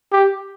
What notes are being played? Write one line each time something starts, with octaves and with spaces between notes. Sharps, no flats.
G4